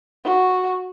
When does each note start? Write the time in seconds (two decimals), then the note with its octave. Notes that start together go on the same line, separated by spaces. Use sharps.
0.24 F#4